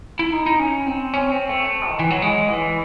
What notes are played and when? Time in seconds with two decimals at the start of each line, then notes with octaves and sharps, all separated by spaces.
0.19 E4
0.32 D#4
0.46 D#4
0.59 C#4
0.86 C4
1.14 C#4
1.32 C4
1.49 A3
1.88 D#3
1.99 E3
2.10 F#3
2.22 G#3
2.49 E3